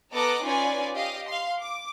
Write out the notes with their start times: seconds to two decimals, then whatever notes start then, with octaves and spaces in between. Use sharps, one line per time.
0.14 B3 A4 D#5 A#5 D6 F#6
0.44 C#4 D#4 F4 B4 D5 G#5
0.95 G4 D#5 F5
1.28 F5 C6
1.61 D6